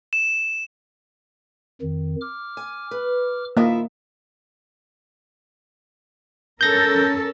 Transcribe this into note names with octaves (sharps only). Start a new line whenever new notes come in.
E7
F2 D#3
D6 F6
G#5
B4
A#3 E4 F4 D#5 E5
C#4 A4 A#4 G6 A#6